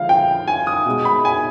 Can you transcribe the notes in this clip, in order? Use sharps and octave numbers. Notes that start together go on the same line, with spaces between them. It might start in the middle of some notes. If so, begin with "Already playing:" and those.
Already playing: D3 F3 G#3 F5
G5
G#5
D#6
B2 G#3
B5
G#5